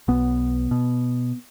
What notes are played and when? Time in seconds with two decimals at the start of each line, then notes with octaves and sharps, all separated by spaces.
0.08 B1 B2 B3
0.71 B2